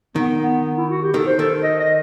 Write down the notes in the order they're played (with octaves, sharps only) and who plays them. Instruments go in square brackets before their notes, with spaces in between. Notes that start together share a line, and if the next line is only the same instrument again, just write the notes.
[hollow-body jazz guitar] D#3 [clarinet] B3
[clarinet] B3
E4
F#4
G4
[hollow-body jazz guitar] D#3 [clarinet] A4
[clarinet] C5
[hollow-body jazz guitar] D#3 [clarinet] A4
[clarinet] D#5
D#5